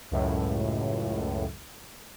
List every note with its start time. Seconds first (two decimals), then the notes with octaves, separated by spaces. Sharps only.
0.11 C#2 F#2 A2